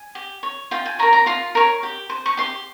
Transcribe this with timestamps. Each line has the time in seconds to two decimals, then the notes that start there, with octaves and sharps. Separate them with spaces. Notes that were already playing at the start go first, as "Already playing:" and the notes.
Already playing: G#5
0.15 G4
0.43 C#5
0.71 F4 G5
0.86 G#5
0.99 A#4 C#5 A#5
1.13 A#5
1.26 F4 C6
1.55 A#4 C#5
1.83 G4
2.10 C5
2.26 C#6
2.37 G4 C6